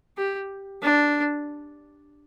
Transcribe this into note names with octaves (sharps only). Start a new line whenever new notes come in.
G4
D4